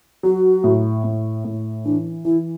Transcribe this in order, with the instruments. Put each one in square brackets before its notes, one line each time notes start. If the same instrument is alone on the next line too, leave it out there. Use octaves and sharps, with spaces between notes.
[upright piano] F#3 [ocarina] F#4
[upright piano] A2
A2
A2
[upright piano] E3 [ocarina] D4
[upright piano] E3 [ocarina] E4